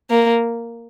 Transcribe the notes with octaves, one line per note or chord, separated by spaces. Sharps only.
A#3